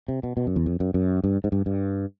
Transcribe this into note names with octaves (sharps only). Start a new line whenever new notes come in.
C3
B2
B2
F#2
E2
F2
F#2
F#2
G2
G#2
G2
G2